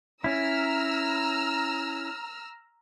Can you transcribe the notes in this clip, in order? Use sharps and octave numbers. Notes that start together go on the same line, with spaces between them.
C#4 E4 A#5 E6 F6